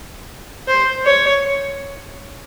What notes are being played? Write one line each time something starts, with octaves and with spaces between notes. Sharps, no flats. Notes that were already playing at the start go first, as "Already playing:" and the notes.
C5
C#5